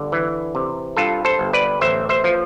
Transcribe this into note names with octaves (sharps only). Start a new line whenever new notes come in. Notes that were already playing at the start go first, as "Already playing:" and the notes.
Already playing: G1 D3
E3
C3
G2 F4 A4
A4 C5
G1
B4 D5
A1 C5 E5
C5 E5
F3